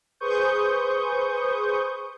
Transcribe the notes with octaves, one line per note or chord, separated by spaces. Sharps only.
G#4 B4 C5 C#6 D#6 G6